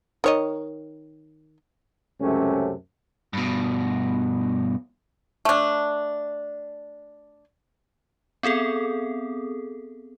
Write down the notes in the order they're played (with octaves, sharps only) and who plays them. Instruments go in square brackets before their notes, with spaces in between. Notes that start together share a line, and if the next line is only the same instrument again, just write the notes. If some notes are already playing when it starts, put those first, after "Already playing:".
[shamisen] D#3 C#5 D#5
[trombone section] C#2 F#2 C3 A3 C#4
[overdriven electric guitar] G2 B2
[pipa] A3 D4
[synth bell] B3 C4 G#4 A4